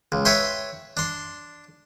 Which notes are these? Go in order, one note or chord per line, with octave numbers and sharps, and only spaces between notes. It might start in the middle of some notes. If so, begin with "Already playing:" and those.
C#2
B4 C#5 E5 G5 C6
D4 C6